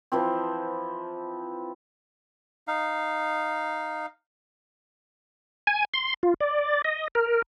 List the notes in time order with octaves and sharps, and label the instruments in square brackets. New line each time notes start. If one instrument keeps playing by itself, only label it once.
[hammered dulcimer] E3 F3 C4
[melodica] D#4 F5
[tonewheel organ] G#5
C6
F4
D5
D#5
A#4